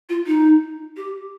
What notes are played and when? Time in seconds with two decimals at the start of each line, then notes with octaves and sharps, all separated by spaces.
0.09 F4
0.27 D#4
0.97 G4